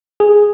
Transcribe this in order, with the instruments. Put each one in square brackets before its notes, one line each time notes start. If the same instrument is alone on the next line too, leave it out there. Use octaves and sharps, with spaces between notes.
[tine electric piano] G#4